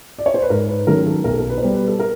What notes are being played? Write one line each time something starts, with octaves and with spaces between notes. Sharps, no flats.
D5
C#5
C5
B4
G#2 A#4
B4
D#3 F#3 A3 C#4 A#4
A4
B1 A#4
A4
A#4
B4
C5
B2 G3 B4
B4
A4
A#4